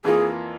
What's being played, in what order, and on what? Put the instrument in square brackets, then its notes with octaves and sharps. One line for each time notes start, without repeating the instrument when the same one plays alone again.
[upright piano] F2 E3 A#3 F4 [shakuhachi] G#4